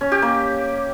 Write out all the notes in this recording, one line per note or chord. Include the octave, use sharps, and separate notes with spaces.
C#4
G4
A#3